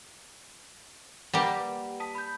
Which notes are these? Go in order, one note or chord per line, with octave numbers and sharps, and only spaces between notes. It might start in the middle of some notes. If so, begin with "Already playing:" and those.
G3 A#3 G4 B4 F#5
A5 D#6 B6
B5 G6